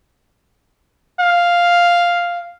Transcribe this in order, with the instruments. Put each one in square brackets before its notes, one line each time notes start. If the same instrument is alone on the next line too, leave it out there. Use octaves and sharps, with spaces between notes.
[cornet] F5